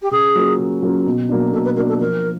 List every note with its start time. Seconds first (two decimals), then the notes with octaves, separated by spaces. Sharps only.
0.02 G4
0.11 C#3 G#4
0.35 F#3 A#3 C#4 F4
0.58 C#3
0.83 F#3 A#3 C#4 F4
1.06 B2
1.29 F#3 A#3 D4
1.53 B2 A4
1.65 B4
1.76 F#3 A#3 D4 A#4
1.89 A4
2.01 F3 A#4